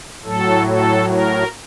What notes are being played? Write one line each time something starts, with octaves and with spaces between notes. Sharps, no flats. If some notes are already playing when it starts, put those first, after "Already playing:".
A2 F#3 A4
A4
A#4